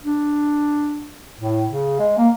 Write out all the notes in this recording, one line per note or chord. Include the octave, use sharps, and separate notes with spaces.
D4
A2
C#3
G#3
A#3